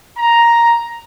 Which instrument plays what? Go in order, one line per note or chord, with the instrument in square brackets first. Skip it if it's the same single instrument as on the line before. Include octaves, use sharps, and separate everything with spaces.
[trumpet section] A#5